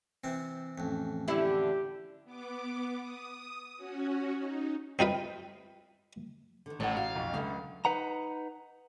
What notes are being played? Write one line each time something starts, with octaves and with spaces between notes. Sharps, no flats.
C3 E3 C4
A1 F2
D3 E4 G4
B3 D6
D#6
C#4 F#4
D#4
C4 D#4 F4 B4
D3 D#3
A1 A2 C#5 F#5
F#4 F5
B1 F2
C#2 D3 F#3 E5
D#4 B4 F#5 A#5